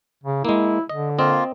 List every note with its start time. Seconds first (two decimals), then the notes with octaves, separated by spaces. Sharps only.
0.23 C#3
0.45 G#3 A#3 E4
0.89 D3 D#5
1.18 A#3 C4 F4 D#5